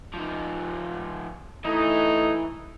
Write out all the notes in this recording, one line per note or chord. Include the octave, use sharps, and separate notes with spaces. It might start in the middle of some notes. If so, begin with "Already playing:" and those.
F3 D#4
E3 A3 D#4